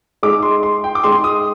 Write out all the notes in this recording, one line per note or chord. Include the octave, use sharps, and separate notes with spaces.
G#3 D#4 G#4 D6
C6
C6
G5
D6
G#3 D#4 G#4 C6
D#6